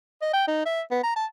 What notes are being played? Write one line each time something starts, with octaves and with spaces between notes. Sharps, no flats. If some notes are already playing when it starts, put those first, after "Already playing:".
D#5
G5
D#4
E5
B3
A#5
A5